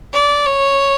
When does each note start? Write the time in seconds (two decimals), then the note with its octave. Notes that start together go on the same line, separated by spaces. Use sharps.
0.13 D5
0.45 C#5